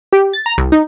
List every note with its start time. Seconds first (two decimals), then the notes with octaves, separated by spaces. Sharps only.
0.13 G4
0.33 A6
0.46 A#5
0.58 C2
0.72 D#4